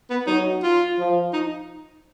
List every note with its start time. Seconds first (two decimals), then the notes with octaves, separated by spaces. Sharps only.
0.10 B3
0.27 F#3 D#4
0.63 F4
0.98 F3
1.33 D#4